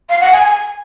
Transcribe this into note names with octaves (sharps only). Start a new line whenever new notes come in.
F5
F#5
G#5
G#5